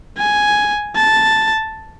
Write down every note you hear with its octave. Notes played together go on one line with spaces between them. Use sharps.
G#5
A5